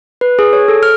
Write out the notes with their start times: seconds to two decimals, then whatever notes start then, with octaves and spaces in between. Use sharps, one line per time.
0.21 B4
0.39 G#4
0.53 C#5
0.68 A4
0.83 F6